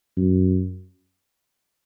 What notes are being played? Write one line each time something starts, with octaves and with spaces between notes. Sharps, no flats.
F#2